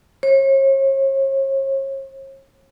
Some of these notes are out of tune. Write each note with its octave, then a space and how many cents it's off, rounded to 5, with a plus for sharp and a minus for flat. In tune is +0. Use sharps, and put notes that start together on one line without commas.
C#5 -40